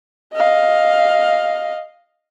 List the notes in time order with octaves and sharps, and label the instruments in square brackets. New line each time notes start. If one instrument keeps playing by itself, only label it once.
[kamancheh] D#5 F5